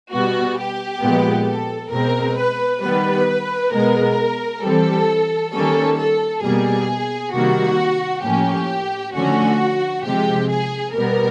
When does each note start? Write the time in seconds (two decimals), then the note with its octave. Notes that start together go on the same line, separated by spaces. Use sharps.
0.12 B2 G3 B3 F#4
0.58 G4
1.03 A#2 F3 G#3 B3
1.47 A4
1.92 B2 G#3 C4 A#4
2.38 B4
2.83 D#3 G3 B3 B4
3.73 B2 G#3 B3 A#4
4.63 E3 G3 C4 A4
5.54 D#3 G3 A#3 C#4 A4
5.98 A4
6.43 B2 G3 A#3 G#4
7.34 C3 D#3 G3 A#3 F#4
8.24 A2 F3 A#3 C#4 G4
9.14 D3 F3 A3 C#4 F#4
10.05 C3 F3 G#3 G4
10.50 G#4
10.95 B2 G3 B3 A#4